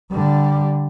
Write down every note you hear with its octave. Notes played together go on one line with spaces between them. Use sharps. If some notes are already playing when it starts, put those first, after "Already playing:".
D3 G3